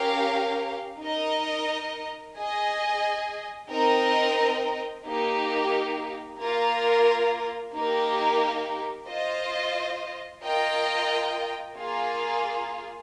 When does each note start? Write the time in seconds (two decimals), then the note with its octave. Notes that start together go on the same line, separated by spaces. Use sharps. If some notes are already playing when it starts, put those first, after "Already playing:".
Already playing: C#4 G4 A#4 F5
1.00 D#4 A#4 D#5
2.35 G#4 D#5 G#5
3.69 C4 D#4 A#4 D#5 G5
5.05 A#3 D#4 G4
6.39 A#3 F4 A#4
7.74 A#3 D#4 G4 A#4
9.08 F4 C5 D#5
10.43 F4 A#4 D#5 G5
11.77 A#3 F4 G#4